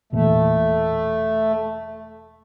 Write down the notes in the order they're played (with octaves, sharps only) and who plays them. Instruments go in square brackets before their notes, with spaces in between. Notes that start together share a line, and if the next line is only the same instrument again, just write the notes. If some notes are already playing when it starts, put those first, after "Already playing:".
[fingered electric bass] E1 A#2 E3 [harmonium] A3